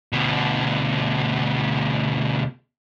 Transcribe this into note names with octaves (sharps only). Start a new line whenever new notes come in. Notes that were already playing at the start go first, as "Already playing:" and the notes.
D2 B2